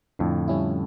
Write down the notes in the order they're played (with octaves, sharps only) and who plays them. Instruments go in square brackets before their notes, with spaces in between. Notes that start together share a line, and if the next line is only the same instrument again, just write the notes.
[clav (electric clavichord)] F2 A2 [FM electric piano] D3
[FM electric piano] G3 C#4 E4